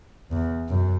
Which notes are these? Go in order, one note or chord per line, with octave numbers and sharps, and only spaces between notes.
E2
F#2